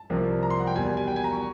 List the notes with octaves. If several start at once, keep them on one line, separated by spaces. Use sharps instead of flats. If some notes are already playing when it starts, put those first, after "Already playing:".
Already playing: A5
C2 C3 F3 A#3
A#5
C6
F#5
G5
E2 B2 G3 A#3 G#5
G#5
G#5
G5
G#5
A#5
C#6